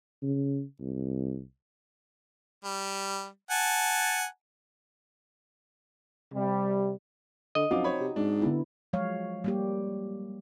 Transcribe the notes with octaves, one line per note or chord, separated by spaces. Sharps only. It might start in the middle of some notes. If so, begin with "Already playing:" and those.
C#3
C2
G3
F#5 G#5 A5
C3 G3
D3 D#5
F#2 F3 C4 D#4 F#4 F5 D6
C5 C#5 B5
C3
G#2 D4
D3 B3 E4
F3 F#3 G#3 C#5 F5
G3 A#3 G4